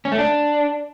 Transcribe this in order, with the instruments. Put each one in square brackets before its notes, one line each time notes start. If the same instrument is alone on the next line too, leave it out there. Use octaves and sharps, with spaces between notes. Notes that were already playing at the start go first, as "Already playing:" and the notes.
[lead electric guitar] C#4
A3
D4